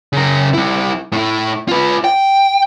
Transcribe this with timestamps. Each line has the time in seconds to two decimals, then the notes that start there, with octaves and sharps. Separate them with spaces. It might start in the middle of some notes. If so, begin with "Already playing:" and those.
0.13 C#3 A#4
0.54 G3 E4
1.12 A2 E4
1.68 F4 B4
2.04 G5